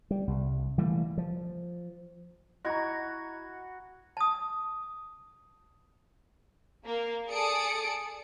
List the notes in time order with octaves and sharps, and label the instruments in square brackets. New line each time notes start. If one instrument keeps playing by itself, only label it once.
[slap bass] G3
C2
E3 G3 A3 A#3
F3
[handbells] E4 G#6 [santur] F#4 C#6 [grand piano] D#5 A#5
[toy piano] A5 D#6
[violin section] A#3
G#4 A4 D5 D#6 C#7 D7